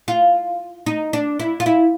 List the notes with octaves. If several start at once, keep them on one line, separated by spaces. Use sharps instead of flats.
F4
D#4
D4
E4
F4
E4